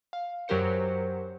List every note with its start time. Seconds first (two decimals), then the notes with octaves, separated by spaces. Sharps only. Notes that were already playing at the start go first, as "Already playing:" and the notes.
0.13 F5
0.48 F#2 F#3 G4 A#4 C5 C#7